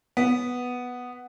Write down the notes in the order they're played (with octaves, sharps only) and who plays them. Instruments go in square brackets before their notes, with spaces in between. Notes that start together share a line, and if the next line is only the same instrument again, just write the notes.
[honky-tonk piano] B3